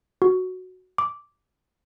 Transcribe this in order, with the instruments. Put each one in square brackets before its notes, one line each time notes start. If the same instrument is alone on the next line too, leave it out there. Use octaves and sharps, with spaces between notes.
[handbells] F#4
D6